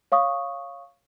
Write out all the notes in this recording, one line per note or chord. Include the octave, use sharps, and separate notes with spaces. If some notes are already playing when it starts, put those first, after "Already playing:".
C#5 F5 C#6 D#6